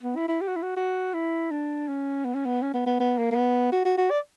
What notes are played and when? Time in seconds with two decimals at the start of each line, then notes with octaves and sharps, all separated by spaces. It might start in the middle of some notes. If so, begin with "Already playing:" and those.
0.03 B3
0.16 E4
0.28 E4
0.41 G4
0.48 F#4
0.56 E4
0.63 F#4
0.77 F#4
1.14 E4
1.51 D4
1.88 C#4
2.25 B3
2.35 C#4
2.45 B3
2.63 C#4
2.74 B3
2.87 B3
3.00 B3
3.18 A#3
3.32 A#3
3.36 B3
3.73 F#4
3.85 F#4
3.98 F#4
4.10 D5